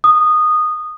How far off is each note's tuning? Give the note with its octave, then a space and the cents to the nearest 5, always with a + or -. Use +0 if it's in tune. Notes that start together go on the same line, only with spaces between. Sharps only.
D#6 -15